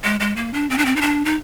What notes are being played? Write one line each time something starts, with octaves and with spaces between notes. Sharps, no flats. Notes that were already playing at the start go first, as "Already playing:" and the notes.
G#3
G#3
A#3
D4
C4
D4
C4
D#4
D4
D#4